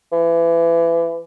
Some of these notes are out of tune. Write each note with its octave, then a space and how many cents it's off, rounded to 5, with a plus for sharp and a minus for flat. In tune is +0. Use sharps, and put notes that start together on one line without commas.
E3 +30